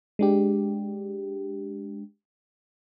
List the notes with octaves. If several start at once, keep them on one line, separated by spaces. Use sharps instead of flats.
G#3 D4 G4